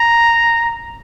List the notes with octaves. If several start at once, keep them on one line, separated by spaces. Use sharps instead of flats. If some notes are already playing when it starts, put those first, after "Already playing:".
Already playing: A#5